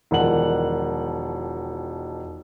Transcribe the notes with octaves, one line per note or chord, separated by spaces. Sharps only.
E1 D#3 F3 F#5 F#7